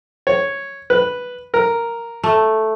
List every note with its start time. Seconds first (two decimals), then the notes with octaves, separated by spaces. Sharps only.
0.27 C#5
0.90 B4
1.54 A#4
2.24 A3